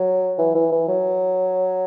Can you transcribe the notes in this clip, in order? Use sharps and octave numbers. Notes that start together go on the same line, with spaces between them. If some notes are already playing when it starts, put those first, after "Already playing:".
Already playing: F#3
E3
E3
E3
F#3